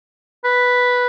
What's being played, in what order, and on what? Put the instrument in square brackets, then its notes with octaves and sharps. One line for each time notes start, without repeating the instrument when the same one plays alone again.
[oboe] B4